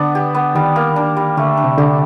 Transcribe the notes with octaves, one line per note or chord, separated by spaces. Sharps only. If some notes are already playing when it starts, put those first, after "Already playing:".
Already playing: D3 B3 D4
G4
B3
D#3 G3
A#3
D4
G3
D3 A3
D4
C3
D3 G4